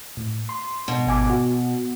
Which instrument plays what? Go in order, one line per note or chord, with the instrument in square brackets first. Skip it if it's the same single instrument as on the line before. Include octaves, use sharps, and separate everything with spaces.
[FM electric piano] A2
C6
[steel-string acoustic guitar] B2
[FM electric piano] G#1 G#5 D6
F#4